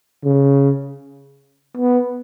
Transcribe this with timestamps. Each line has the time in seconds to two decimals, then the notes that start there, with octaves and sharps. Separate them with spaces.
0.25 C#3
1.78 B3